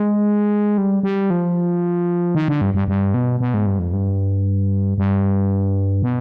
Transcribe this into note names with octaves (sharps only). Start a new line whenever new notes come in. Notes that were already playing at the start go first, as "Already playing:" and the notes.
Already playing: G#3
G3
G3
F3
D#3
D3
G2
G2
G2
B2
B2
G#2
G2
F2
G2
G2
B2